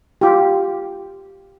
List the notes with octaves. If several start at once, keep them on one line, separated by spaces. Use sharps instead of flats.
F4 G4